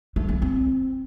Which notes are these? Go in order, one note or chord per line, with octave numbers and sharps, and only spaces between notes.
A3
A#3
C4